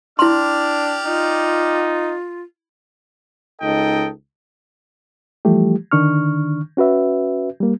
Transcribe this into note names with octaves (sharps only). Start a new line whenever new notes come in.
D4 E4 G4 D5 C6 F6
D#4 F4
C#2 D#4 A4 D#5 G5
E3 F3 G3 A3 G4
D3 D#3 D4 C#6 F6
C#4 F#4 B4 E5
G3 A#3